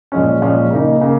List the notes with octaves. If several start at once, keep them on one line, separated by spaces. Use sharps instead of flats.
A#2 F3 G#3 C#4
A#2 F3 G#3 C#4
C#3 A#3 D#4
C#3 A#3